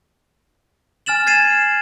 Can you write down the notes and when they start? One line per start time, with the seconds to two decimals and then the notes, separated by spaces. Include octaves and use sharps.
1.06 G#5 F6 A6 E7 F#7
1.26 G#6 A6 C7 D#7 E7